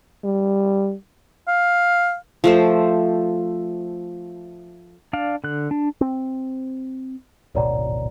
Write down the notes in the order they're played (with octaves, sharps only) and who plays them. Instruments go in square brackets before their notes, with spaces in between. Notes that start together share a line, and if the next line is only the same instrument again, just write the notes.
[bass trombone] G3
[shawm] F5
[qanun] F3 A3 C5
[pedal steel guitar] D4 D5 F5
D3 F#6
D4
[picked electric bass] C4
[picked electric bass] D1 G#1 B2 [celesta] C#5 D5 A#5